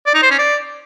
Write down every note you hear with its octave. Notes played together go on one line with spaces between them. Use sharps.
D5
D#4
C5
C#4
D5